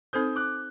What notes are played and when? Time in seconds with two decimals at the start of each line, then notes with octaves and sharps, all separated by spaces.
0.13 C4 D#4 A4 C5 D#6 G6
0.36 D6 F#6